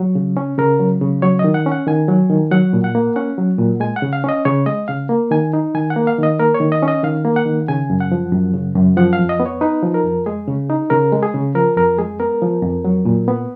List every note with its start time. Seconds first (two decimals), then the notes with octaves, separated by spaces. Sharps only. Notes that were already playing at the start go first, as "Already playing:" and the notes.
Already playing: F#3
0.15 C#3
0.37 C#4
0.58 C#3 A#4
0.79 F#3
1.01 C#3
1.22 F#3 C#5
1.39 D#5
1.44 D#3
1.54 F#5
1.66 C#4
1.72 F#5
1.87 D#3 G#5
2.08 F#3
2.30 D#3
2.51 F#3 F#5
2.73 A#2
2.84 F#5
2.95 A#3
3.16 C#4 F#5
3.38 F#3
3.59 A#2
3.80 G#3 G#5
3.96 F#5
4.02 C#3
4.13 F5
4.24 C#4 D#5
4.45 C#3 C#5
4.66 G#3 D#5
4.88 C#3 F5
5.09 A#3
5.31 D#3 G#5
5.53 D#4
5.75 D#3 G#5
5.90 F#5
5.96 A#3
6.07 F5
6.18 D#3
6.23 D#5
6.39 A#3 A#4
6.55 C#5
6.60 D#3
6.72 D#5
6.83 C#4
6.88 D#5
7.03 D#3 F5
7.25 A#3
7.36 F#5
7.46 D#3
7.68 C#3 G#5
7.90 F#2
8.01 F#5
8.12 F3
8.32 F#2
8.54 C#3
8.76 F#2
8.97 F3 F#5
9.13 F5
9.19 F2
9.29 D#5
9.40 B3
9.46 C#5
9.61 D#4 B4
9.83 F3
9.94 A#4
10.04 F2
10.26 G#3 G#4
10.47 C#3
10.70 D#4
10.90 C#3 A#4
11.13 G#3
11.23 G#4
11.34 C#3
11.55 F3 A#4
11.77 F2 A#4
11.98 G#3 G#4
12.20 B3 A#4
12.42 F3
12.63 F2
12.84 F#3
13.05 A#2
13.28 B3